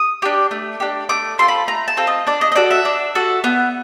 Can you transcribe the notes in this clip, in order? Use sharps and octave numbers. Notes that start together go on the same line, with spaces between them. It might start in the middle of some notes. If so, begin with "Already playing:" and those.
Already playing: D#6
D4 G4
A3
D4 G4
A3 D6
C4 F4 A4 C6
B5
A3 A#5
A5
C4 F4 A4
D#5
D4 D5
D#5
D#5
F#4 A4 D5
E5
D4
F#4 A4
B3